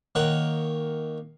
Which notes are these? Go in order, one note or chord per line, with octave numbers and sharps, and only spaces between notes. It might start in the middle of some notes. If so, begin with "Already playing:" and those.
D#3 A#3 C#5 F#5